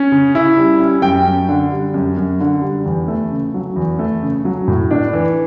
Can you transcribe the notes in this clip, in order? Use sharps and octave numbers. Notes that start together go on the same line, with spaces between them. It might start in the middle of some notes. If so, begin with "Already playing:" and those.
Already playing: C#4
C#3
E4
G3
C#4
F#2 G5
F#2
D3
G3
F#2
F#2
D3
G3
E2
A3
C#3
F#3
E2
A3
C#3
F#3
A2
D4
E3